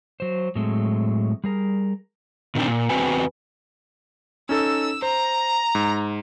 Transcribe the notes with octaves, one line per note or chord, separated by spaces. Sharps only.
F#3 C5
A2 F#3 G#3 C4 A4
G3 G#4 A#4
A#2 D#3 C4 D4
A#2
E2 G3 C4 F#4 B4 G#5
C#4 D#4 A4 E6
C5 A#5
G#2